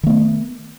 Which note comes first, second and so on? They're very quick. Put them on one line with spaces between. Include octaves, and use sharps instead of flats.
D#3 A3 B3